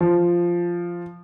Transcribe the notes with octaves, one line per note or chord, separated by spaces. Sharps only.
F3